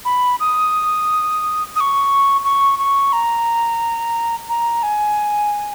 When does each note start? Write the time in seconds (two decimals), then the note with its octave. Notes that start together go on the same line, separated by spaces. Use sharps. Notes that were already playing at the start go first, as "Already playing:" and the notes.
0.05 B5
0.40 D#6
1.76 D#6
1.80 C#6
2.44 C#6
2.79 C#6
3.13 A#5
4.49 A#5
4.83 G#5